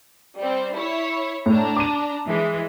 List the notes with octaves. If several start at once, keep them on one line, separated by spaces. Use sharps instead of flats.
G3 C4
E4 C#5
A2 D4 A#5
D6 D#7
E3 G#3